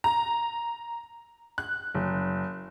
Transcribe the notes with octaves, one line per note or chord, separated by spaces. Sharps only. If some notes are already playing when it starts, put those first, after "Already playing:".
A#5
F#6
F#1